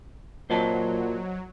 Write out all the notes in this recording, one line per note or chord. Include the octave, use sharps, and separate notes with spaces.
A#2 F#3 C5 D#5 A5